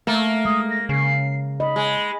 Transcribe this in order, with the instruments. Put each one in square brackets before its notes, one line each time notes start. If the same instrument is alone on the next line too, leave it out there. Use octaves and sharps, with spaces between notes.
[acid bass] A3 [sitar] A#3
[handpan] G#3 [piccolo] D#6
[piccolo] A#6
[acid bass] C#3 [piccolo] C7
[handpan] D#5 [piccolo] B5
[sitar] G#3